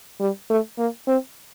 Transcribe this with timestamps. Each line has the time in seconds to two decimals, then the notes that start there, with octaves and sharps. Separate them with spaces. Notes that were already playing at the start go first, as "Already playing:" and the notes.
0.20 G3
0.50 A3
0.78 A#3
1.07 C4